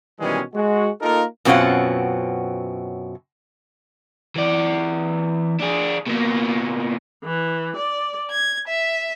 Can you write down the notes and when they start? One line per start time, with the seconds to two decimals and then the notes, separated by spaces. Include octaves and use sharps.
0.20 B2 D#3 E3 G3 G#3 C#4
0.55 G#3 F#4
1.01 A#3 D#4 F4 A4 A#4
1.45 F#2 B2 C4 C#4 F4 F#5
4.36 E3 D5
5.60 D4 G#4
6.06 B2 A#3
7.24 E3
7.76 D5
8.30 G#6
8.69 E5